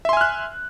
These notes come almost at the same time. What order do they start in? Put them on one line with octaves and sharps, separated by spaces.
E5 C6 G#5 F6 F#6